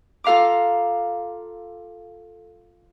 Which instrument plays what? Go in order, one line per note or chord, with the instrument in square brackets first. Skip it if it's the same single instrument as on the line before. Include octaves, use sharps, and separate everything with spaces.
[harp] F4 A4 F5 A#5 D6